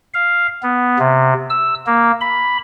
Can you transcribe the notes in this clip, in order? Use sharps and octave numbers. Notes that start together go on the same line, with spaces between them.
F5
B3
C3
E6
A#3
B5